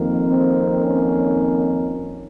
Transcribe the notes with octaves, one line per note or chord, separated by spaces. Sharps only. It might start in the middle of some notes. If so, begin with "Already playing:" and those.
Already playing: F2 D#3 A#3
C4
C#4